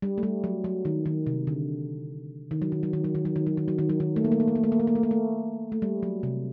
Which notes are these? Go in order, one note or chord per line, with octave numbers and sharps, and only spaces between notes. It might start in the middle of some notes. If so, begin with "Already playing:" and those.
G3
A3
G3
F#3
F#3
D#3
D#3
C3
D3
D#3
F#3
D#3
F#3
D#3
F#3
D#3
F#3
D#3
F#3
D#3
F#3
D#3
F#3
D#3
A3
A#3
A3
A#3
A3
A#3
A3
A#3
A3
A#3
A3
A#3
A3
A3
G3
F#3
C3